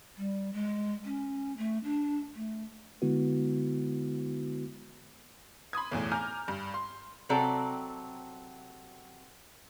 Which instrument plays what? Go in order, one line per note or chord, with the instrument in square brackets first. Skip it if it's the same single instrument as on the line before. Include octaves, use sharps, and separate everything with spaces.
[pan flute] G3
G#3
C#4
A3
D4
A3
[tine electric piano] D3 G#3 B3 E4 F#4 B4
[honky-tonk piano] B5 C6 D#6 G#6
B1 E2 A2
G#5 A#5 D6 F6 G6
G2
C6
[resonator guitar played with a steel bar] C3 F#3 C4 A4 D5 A#5